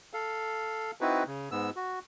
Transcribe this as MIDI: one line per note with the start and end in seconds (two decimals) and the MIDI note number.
0.13 0.91 69
0.13 0.91 77
1.01 1.23 60
1.01 1.23 63
1.01 1.23 64
1.01 1.23 66
1.01 1.23 71
1.26 1.49 49
1.51 1.70 44
1.51 1.70 59
1.51 1.70 88
1.76 1.99 66